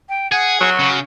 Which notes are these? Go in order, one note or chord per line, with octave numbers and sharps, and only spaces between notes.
G5
G#4 F#5
F#3 F#4
C#3